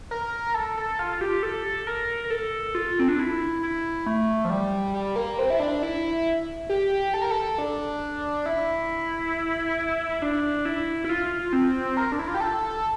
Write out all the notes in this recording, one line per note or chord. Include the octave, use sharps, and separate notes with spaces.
A#4
A4
A4
F4
G4
A4
A#4
A#4
A4
F4
C4
D4
E4
E4
A3
F3
G3
G3
A#3
C4
E4
D4
E4
G4
A4
A#4
A4
D4
E4
D4
E4
E4
F4
C4
A#4
D4
E4
F4
G4
A4